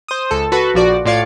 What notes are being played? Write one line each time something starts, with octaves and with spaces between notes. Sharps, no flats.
C5 D#6
C#2 A4
F#4 A4 B4
A#1 F3 F#4 D5
A2 F4 D5 F5 G#6 C#7